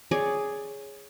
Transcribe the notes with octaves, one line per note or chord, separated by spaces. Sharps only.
G#4 C#5 D5